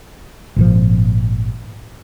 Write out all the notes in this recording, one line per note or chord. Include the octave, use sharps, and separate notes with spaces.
G#1 A#2 F3